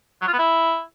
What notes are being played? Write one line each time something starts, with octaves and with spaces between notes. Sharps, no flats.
F#3
F4
B3
E4